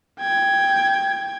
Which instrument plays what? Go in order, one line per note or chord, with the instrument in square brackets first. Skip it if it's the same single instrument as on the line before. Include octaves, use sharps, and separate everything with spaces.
[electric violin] G5 G#6